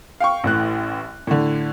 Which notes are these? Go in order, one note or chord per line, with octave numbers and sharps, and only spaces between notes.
F5 G5 C#6
A1 A2 F#6
A2 D3